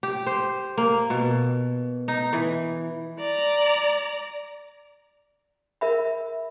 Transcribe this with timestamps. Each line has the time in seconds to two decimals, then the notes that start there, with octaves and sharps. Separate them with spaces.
0.03 G4
0.26 C5
0.78 A#3
1.10 B2
2.08 D#4
2.33 E3
3.20 D5 A#5
5.81 A#4 E5 B5